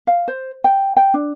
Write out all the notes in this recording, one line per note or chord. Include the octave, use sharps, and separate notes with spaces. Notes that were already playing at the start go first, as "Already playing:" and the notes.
F5
C5
G5
G5
D4